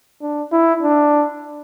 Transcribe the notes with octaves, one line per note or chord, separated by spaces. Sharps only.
D4
E4
D4